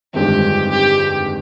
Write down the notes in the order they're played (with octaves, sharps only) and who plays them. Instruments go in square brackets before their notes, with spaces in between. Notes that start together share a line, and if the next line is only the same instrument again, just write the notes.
[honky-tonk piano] G1 F2 D#3 G#3 D4 [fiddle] G4
[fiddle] G4